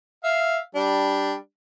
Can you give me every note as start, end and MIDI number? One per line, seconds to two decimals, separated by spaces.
0.24 0.58 76
0.24 0.58 77
0.75 1.34 55
0.75 1.34 62